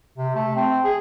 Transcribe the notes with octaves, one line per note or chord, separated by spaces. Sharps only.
C3
A3
C4
G#4